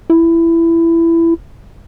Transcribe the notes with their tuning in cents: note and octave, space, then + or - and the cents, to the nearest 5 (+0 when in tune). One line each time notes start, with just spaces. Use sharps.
E4 +15